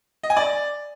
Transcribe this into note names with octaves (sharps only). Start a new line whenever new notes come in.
D#5
G#5
D5